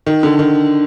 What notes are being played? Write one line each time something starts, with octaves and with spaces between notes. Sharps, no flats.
D#3
D3
D#3